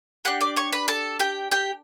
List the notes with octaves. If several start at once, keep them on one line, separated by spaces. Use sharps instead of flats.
D4 G4 F#5 F#6
D5 D6
C#5 C#6
B4 B5
A4 A5
G4 G5
G4 G5